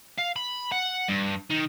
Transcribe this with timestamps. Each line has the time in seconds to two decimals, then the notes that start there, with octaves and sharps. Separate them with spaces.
0.18 F5
0.36 B5
0.72 F#5
1.08 G2
1.50 D#3